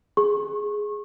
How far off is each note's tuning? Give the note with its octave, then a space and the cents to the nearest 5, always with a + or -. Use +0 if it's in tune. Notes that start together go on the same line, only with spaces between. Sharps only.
G#4 +0 C#6 -30